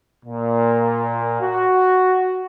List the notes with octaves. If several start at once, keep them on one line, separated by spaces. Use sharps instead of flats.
A#2
F#4